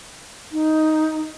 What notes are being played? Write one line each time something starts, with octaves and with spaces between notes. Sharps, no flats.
D#4